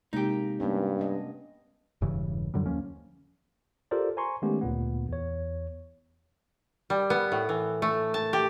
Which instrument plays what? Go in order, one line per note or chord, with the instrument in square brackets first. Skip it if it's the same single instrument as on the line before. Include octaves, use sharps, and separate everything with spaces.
[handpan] C3 G#3 A#3 [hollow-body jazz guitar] D#4 G4
[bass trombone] G2 [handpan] A#3 B3 C#4
[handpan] D4 D#5
[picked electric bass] E1 G2 C#3 E3
F#2 D3 F#3 G3
D#2 F3 A#3 C#4
[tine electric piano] F4 G4 A4 A#4 C5 D5
C5 G#5 A#5 C6 C#6
D#3 G#3 A3 B3 C#4 G4
D2 A#2 B3
E2 C#5
[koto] G3
B3
A2
E3
A3
A5
G4